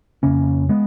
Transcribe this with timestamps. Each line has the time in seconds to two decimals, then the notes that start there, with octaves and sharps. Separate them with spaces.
0.23 F2 C#3 A#3 C#4
0.69 G#3 B3